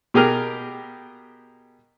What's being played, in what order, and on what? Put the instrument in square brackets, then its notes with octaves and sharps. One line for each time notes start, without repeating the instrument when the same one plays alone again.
[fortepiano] B2 G4 G#4 A#4 F6